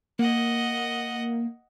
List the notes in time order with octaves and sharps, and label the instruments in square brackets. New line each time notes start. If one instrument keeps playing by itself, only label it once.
[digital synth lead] A#3 [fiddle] D#5 F#5